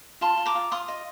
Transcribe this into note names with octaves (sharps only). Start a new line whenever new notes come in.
F4 A5 C6
F4
A#5 D6
F4
F4 C6 D#6
D#5